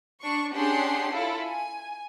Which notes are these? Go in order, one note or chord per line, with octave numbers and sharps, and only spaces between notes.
D4 C#6
C#4 D4 G4 G#4 F#5 C6
E4 F4 A4
G#5